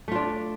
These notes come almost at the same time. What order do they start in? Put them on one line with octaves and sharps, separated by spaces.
A3 F4 D4